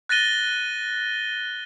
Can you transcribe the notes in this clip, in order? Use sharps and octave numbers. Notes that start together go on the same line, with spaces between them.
F#6 A6 A#6 D#7 G7